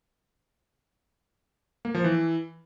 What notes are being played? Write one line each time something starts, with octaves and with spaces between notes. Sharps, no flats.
A#3
F3
E3